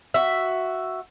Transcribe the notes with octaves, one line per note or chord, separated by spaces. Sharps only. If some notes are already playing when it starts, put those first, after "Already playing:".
F#4 E5